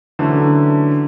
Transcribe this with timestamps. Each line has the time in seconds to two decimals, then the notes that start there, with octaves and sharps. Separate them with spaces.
0.19 D3 E3 F#3 A3 C#4